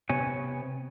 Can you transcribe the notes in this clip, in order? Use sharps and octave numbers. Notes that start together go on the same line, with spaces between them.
C3 B3 C#5 G#5